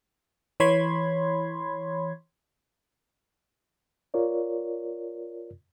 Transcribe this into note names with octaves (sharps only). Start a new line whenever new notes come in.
E3 C#5 B5 C6 G#6
F4 A#4 C#5 D5